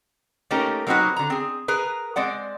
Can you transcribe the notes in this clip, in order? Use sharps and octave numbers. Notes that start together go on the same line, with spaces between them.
A3 A#3 C#4 D#4 G4 A#4
F#3 A#3 C4 D#4 F#4 B4
D3 A#5
C4 G#4
G#4 A#4 B4
G#3 C4 D5 F#5